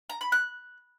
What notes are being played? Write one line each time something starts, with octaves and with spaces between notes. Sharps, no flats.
A#5
B5
F#6